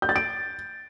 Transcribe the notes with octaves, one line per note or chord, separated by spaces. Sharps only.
G6
A6
D7